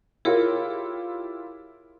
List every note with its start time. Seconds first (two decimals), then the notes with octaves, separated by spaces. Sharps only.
0.25 E4 F4 G4 G#4 A#4 C#5